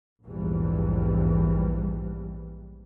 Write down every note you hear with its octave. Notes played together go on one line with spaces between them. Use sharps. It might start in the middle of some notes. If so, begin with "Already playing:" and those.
A#1 E2 G#2 E3 G3